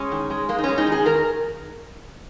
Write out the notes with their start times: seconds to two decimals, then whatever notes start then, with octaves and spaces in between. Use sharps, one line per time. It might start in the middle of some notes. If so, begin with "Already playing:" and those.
Already playing: G#3 C#4
0.12 D#3
0.30 G#3
0.49 G#3 A#3
0.58 D#4
0.64 G#3 C#4
0.78 D#4
0.87 D#3
0.92 G#4
1.06 D#3 A#4